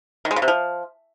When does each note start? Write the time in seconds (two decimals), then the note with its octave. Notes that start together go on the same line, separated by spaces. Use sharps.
0.25 D#3
0.31 G#3
0.36 C#3
0.42 C3
0.48 F3